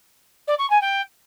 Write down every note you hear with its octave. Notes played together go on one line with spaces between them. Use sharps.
D5
C#6
G#5
G5